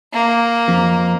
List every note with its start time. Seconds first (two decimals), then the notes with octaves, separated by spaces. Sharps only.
0.13 A#3
0.68 F2